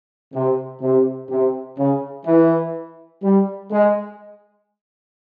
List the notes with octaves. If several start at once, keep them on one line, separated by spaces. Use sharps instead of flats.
C3
C3
C3
C#3
E3
G3
G#3